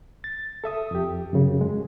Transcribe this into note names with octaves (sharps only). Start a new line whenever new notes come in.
A6
A4 E5 D#6
F2 G4
F#2 C#3
G#3